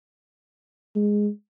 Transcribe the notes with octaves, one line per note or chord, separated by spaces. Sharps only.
G#3